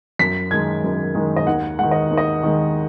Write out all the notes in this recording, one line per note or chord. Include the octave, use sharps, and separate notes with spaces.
F#2 B6
D#3 G#3 G#6
F#2
D#3 G#3
D#5
D#2 F#5
D#3 G#3 F#5
D#5
D#2
D#5
D#3 G#3